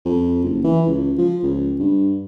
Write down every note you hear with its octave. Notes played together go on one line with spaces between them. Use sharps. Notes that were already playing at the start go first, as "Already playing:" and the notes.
F2
F#1
E3
C#2
F3
C#2
G2